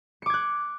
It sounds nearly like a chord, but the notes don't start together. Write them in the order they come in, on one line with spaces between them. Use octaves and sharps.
C#7 D6 G#6 F#6